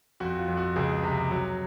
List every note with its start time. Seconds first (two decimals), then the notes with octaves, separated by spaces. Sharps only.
0.20 F2 F#4
0.39 F4
0.48 F2
0.57 F#4
0.76 C#2 G#4
1.03 C3
1.31 F#3